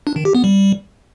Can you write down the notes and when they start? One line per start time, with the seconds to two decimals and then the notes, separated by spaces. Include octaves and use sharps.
0.07 D4
0.16 D#3
0.25 G4
0.35 B3
0.44 G3